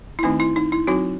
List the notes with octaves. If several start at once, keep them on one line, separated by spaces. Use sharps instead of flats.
E4
D#3 A3 C4 D#4
E4
D#4
E4
F#3 C4 D#4 F#4